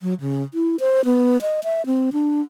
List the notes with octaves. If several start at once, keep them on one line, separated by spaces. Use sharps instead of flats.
F#3
C#3
E4
C5
B3
D#5
E5
C4
D4